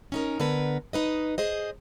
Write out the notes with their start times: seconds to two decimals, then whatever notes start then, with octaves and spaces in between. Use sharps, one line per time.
0.12 C#4 D#4 A#4
0.40 D3 B3 A#4 B4
0.93 D#4 B4 D#5
1.38 G#4 C5 D#5